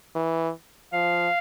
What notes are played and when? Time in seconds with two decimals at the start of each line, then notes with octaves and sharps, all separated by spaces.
0.15 E3
0.93 F3 F5